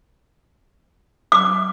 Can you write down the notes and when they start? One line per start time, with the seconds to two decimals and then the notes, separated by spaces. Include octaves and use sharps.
1.32 D6